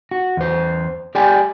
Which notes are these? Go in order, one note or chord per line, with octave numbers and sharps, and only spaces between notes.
F#4
E2 C5
G4 G#4 D5 G5 G#5